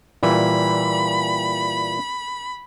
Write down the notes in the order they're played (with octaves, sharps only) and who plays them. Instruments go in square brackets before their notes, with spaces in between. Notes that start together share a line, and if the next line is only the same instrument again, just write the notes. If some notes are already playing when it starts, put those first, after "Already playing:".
[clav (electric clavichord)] A#2 E3 G3 [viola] B5